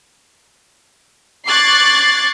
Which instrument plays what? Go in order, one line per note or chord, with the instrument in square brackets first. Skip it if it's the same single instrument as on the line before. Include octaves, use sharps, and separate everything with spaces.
[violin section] C#6 D6 F#6 G#6 A6 C7